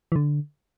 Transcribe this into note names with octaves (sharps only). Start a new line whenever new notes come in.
E3
D3